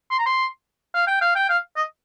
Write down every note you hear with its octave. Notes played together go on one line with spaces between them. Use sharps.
C6
A#5
C6
F5
G5
F5
G5
F5
D#5